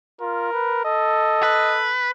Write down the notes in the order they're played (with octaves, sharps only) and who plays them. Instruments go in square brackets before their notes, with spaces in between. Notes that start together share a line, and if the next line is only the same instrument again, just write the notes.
[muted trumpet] F4 [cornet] A#4
[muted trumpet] B4
[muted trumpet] A4 [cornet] D#5
[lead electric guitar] B4